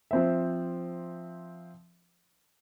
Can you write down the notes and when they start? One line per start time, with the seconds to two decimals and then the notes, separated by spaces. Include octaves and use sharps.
0.11 F3 C4 E5